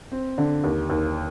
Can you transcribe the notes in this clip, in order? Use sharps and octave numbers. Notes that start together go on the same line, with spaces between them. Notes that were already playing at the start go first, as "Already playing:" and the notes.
C4
D3
D#2
D#2